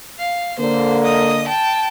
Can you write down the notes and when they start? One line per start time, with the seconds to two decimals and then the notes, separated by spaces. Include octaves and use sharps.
0.19 F5
0.59 D3 A#3 C5
1.04 D#5 D#6
1.48 G5 A5